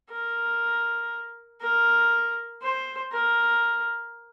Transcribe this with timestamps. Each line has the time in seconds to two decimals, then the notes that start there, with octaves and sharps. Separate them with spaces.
0.10 A#4
1.62 A#4
2.63 C5
3.12 A#4